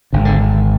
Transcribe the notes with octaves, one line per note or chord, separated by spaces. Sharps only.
G#1 G#2 D3
D3